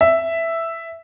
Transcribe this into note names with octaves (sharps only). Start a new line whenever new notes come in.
E5